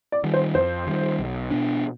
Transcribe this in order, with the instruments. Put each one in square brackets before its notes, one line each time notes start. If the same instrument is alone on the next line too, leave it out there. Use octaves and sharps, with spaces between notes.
[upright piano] D5
[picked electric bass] D#3 G3
[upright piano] C5
[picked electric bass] F2 [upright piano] C5
[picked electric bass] D#3 G3
B1
B2 B3 D4